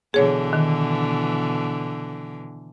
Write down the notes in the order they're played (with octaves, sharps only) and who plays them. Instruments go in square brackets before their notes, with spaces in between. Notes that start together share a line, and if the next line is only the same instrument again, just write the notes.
[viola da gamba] B2 D3 E3 [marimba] G#4 C#5
[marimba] D#3